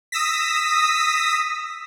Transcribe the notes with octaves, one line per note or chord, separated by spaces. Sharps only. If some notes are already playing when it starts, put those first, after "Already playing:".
D#6 E6 A#6 B6